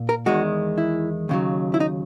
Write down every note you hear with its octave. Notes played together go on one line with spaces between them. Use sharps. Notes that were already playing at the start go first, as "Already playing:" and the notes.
Already playing: A#2
A#4
E2 D#3 G#3 F#4
E4
D#2 C#3 F#3
E4
D#4